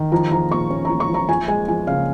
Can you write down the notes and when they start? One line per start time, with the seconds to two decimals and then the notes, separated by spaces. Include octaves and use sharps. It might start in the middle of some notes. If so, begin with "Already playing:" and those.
Already playing: D#3
0.12 F3 A#5
0.31 F3 A#5
0.51 A#2 C#6
0.70 C#4
0.85 F3 A#5
1.00 C#6
1.09 F3
1.14 A#5
1.28 F3 G#5
1.48 G#3 G#5
1.68 F3 G#5
1.87 C#3 F5